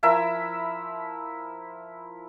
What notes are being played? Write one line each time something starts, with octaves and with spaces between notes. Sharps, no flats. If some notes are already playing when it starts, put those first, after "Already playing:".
F3 E4 A#4 E5